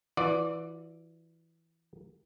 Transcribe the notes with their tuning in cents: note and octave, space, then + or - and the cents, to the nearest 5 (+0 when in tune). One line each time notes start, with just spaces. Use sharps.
E3 +0 F#4 -45 D5 +0